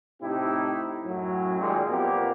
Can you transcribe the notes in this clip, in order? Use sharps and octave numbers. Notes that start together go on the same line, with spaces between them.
A2 C3 D#4 E4 G4
F#2 A2 F#3
A#2 D#3 G3 G#3
F2 A#2 A#3 B3 G4 A#4